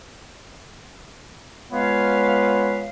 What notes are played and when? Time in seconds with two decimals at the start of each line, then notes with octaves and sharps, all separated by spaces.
1.72 G#3 B3 F4 B4 C#5 F5